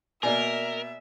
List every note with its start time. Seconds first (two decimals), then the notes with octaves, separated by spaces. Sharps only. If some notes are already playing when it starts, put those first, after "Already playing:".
0.23 B2 A#3 A#4 D5 E5 G#5